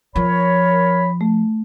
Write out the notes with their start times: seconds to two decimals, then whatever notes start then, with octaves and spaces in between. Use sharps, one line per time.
0.16 F3 A#4 C#5 B5
1.21 A3